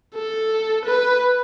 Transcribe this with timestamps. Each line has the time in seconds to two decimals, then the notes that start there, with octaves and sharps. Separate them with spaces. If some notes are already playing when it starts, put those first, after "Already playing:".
0.15 A4
0.85 B4